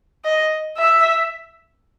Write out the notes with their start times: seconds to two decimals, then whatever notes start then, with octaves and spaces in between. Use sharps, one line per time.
0.25 D#5
0.77 E5